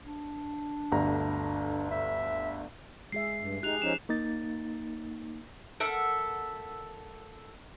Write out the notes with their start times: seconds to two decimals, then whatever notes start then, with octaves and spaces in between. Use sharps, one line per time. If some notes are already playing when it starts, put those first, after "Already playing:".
0.05 D4
0.92 G1 D2 A#5
1.91 E5
3.12 G#3 G#4 E5 C7
3.39 G2
3.63 D#4 G4 G#4 F#6 F7
3.82 F3 C#4 D#4 E7
4.09 A#3 D#4 A6
5.80 A4 A#4 E5 F#5